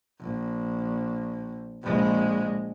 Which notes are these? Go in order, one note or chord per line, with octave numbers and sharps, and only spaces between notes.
A#1
A#1 G#3